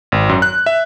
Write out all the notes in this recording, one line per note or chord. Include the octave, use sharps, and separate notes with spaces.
G#1
F#2
F#6
E5